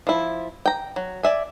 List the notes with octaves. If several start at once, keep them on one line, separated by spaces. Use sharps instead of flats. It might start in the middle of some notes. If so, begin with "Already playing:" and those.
F3 E4
G5 A#5
F#3
D5 E5 G#5